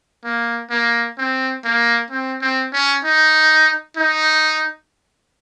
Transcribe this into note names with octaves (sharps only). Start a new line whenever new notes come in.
A#3
A#3
C4
A#3
C4
C4
C#4
D#4
D#4